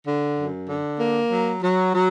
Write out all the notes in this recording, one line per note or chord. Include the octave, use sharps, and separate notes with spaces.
D3
F#2
D3
A#3
F#3
F#3
F#3